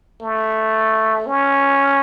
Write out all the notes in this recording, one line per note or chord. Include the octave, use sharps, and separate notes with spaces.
A3
C#4